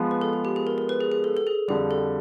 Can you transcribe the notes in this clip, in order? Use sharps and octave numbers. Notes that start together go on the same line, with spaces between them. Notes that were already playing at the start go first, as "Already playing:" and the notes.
Already playing: F3 G#3 B3
B4
A4
G#4
G4
G#4
A#4
A#4
B4
G#4
G#4
A4
A4
G#4
F2 D3 G3 G#4
A4